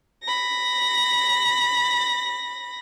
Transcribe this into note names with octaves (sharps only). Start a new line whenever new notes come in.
B5 A#6